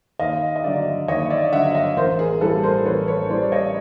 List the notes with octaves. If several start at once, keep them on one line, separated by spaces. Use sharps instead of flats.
D#2 D#5 F5
D#5
D3 F#3 D5 E5
D#2 C#5 D#5
D5 E5
D3 F#3 E5 F#5
D#5 F5
A1 A#4 C5
G#4 A#4
A2 E3 G3 A4 B4
A#4 C5
A1 B4 C#5
B4 C#5
A2 E3 G3 C5 D5
D5
C#5 D#5